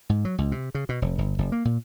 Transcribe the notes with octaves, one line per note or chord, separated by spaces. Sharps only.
G#2
F#3
C#2
C3
C#3
B2
F1
G1
F#1
A#3
A#2